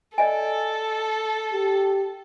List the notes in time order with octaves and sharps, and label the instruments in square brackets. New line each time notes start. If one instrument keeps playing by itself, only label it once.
[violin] A4 [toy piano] D5 D#5 G#5
[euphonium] G4